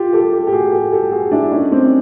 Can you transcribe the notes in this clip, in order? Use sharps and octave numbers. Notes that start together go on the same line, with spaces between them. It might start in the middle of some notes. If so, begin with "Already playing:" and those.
Already playing: F4 G4
G4 A4
G4 A4
G4
F#4 G#4
G4 A4
G4 A4
F#4 G#4
D4 E4
C#4 D#4
C4 D4